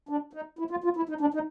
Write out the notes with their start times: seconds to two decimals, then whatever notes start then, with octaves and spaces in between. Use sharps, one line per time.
0.09 D4
0.33 D#4
0.59 E4
0.71 F4
0.84 F4
0.96 E4
1.09 D#4
1.21 D4
1.34 D#4